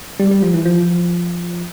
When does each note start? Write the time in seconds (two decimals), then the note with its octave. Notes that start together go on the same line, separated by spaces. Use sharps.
0.20 G3
0.31 G3
0.42 F3
0.54 E3
0.65 F3